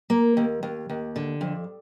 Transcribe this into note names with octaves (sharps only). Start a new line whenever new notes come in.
A#3
D#2
D#2
D#2
D3
F2